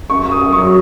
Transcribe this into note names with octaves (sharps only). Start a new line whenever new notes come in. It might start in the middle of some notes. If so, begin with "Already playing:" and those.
F#2 C#6
F#2
D#6
F#2
C#6
F#3